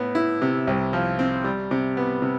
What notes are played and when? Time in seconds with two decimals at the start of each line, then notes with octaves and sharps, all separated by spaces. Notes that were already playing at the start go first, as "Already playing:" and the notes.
Already playing: A2 B3
0.15 E4
0.42 C3
0.67 C2
0.93 F3
1.19 C4
1.44 G3
1.71 C3
1.97 B3
2.22 C3